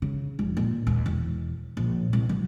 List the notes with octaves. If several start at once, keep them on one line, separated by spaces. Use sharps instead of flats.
C#3
F1
A#2
D#2
E1
A#1
C2
F#3